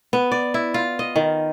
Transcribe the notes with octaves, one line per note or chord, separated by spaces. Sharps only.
B3
D5
E4
F4
D#5
D#3